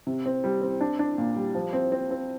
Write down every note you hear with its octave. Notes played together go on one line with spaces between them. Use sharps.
C3
C4
G3
C4
D4
D4
A#2
G3
F3
C4
C4
C4